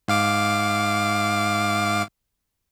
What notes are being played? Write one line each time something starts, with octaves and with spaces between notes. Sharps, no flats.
G#2 F5 D6